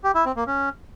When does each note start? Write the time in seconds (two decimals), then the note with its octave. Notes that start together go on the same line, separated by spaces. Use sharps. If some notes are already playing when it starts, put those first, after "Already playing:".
0.04 G4
0.15 E4
0.26 C4
0.36 A#3
0.47 C#4